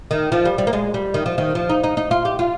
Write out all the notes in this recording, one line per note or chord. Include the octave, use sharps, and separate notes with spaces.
D#3
F3
G3
G3
A#3
G#3
G3
D#3
F3
D#3
F3
D#4
D#4
D#4
F4
G4
F4